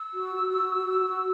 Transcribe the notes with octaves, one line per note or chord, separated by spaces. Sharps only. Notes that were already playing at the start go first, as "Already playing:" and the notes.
Already playing: E6
F#4
F#4
F#4
F#4
F#4